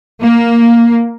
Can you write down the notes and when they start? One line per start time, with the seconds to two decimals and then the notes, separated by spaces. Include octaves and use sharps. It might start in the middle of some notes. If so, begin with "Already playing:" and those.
0.22 A#3